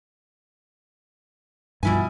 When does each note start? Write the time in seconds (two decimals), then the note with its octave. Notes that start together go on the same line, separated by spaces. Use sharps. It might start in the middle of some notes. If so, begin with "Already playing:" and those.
1.83 G2 B2 F3 E4 G#5